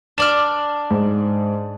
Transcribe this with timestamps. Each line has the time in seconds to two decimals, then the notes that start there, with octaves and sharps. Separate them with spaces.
0.18 D4 D5 F6 E7
0.91 G#2